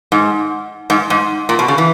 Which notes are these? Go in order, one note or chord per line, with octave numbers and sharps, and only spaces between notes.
G#2
G#2
G#2
A#2
B2
C#3
E3